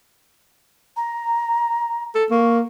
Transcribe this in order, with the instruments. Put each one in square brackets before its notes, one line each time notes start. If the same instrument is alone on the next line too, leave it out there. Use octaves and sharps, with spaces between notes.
[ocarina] A#5
[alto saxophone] A4
[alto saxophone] A#3 [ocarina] C#6